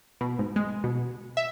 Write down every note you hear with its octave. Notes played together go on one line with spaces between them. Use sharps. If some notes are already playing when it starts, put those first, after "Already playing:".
B2
G#2
G#3
B2
E5